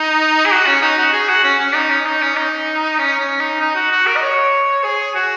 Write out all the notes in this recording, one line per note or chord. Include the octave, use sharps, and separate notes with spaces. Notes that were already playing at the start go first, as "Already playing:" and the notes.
Already playing: D#4
G#4
F#4
C#4
D#4
F#4
G#4
F#4
C#4
C#4
D#4
C#4
D#4
C#4
D#4
C#4
C#4
D#4
D#4
F#4
F#4
A#4
D#5
C#5
G#4
F#4